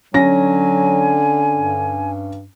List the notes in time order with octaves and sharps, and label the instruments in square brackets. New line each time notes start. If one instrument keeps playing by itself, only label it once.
[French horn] D3 [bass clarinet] F#3 [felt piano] C#4 A#6 [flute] G#5
[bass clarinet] G2